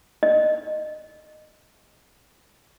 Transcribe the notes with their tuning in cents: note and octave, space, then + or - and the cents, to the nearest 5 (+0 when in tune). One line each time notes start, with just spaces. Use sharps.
D#5 -20